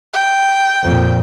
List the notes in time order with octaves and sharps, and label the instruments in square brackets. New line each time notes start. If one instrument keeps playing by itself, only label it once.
[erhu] G5
[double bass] F2 A#2